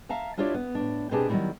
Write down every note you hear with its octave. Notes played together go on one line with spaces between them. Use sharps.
E5 F5 A5 A#5
D4 E4 F4 G4 C#5 D5
B3
A2 D4
B2 C4 D4 G4 G#4 A5
D#3 F#3 G3 A3 A#3 E4